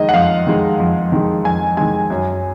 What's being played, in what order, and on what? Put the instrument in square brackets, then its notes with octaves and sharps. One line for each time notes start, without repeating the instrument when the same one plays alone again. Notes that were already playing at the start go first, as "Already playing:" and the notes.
Already playing: [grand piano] F2 D#3 G#3 D#5
F#5
F2 F5
D#3 G#3
F2
D#3 G#3
F2 G#5
D#3 G#3 G#5
F#2